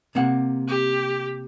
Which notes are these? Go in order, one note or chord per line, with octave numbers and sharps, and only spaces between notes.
C3 A#3 F#5
G4